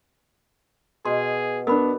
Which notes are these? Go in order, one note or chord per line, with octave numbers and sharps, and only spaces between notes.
B2 G#4 C6
B3 D4 A#4 B4 B5